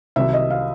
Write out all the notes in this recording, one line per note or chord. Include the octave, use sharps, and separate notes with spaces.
C2 C3 D#3 F#3 E5
D#5
F5